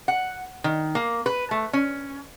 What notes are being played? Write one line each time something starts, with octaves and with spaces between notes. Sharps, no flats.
F#5
D#3
A#3
B4
A3
C#4